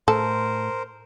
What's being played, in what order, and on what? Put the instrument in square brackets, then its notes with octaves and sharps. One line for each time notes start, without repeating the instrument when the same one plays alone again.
[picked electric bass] A2 [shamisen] A4 [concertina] A#4 C5